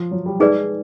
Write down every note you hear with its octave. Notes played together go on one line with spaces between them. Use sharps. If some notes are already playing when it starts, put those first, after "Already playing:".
Already playing: F3
F#3
G3
G#3 D#4 G#4 B4 D5